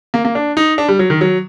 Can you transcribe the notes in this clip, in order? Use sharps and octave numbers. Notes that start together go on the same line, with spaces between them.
A#3
A#3
D4
D#4
D4
G3
F#3
D#3
F#3